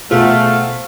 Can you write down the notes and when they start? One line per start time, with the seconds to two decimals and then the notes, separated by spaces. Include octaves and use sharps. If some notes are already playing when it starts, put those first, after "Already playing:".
0.11 B2 A3 F4 G#4 C5 F5 F#5